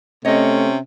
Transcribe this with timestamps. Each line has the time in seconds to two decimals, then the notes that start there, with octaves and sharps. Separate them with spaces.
0.25 C3 A3 C#4 C#5 D#5